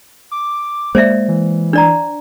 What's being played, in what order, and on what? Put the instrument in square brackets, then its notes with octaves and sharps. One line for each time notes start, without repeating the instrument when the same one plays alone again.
[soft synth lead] D6
[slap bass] G#3 A#3 [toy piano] C5 D5 E5
[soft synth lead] E3
[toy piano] D4 D5 A#5